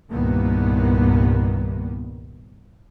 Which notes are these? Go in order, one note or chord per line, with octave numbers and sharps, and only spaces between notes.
C2 G2 A#2 D#3 A#3 B3